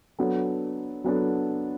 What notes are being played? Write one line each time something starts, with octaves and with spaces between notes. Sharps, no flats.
F#3 B3 D4 A4
F#3 B3 D4 A4